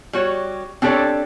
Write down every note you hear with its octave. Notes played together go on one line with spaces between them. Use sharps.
G3 F#4 C#5
C4 D4 G4 A4 C#5 D5